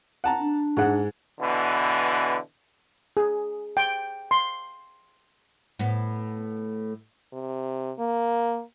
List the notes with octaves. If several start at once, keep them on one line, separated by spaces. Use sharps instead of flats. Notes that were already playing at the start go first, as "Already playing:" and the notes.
F#5 A5 A#5
D4
G#2 G#3 F#5
B2 D3 E3
G#4
G5
C6
A2 B3
C3
A#3